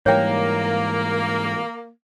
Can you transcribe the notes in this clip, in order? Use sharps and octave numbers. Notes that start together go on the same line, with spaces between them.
G#2 E3 G3 A#3 C#5 G5